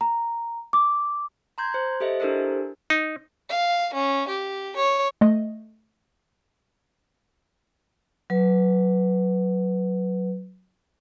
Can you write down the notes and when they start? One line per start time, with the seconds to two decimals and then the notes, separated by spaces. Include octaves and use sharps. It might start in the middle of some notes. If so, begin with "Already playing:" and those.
0.01 A#5
0.73 D6
1.58 A#5 C6 G6 G#6
1.74 C5
2.00 G4 A4 C5 D#5 E5
2.20 D4 E4 G4 A4 A#4 C5
2.90 D#4
3.49 F5
3.93 C#4
4.28 G4
4.76 C#5
5.21 A3 D#5
8.30 F#3 B4